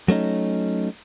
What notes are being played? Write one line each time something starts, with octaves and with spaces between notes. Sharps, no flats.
F#3 A3 C#4 D#4